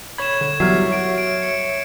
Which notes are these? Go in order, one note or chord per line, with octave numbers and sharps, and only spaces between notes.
C#5 B5 G#6 E7
D3
E2 F#3 G3 C#5 E5 F6 C7
F#4 D7
D7
C#7